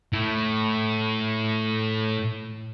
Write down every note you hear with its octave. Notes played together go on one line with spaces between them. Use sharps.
A2 E4